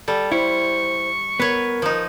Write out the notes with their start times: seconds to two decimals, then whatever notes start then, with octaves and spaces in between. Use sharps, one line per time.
0.08 G3 A4
0.32 E4 C5 C#6
1.40 B3 A#4 B4 C#5
1.82 F3 D#4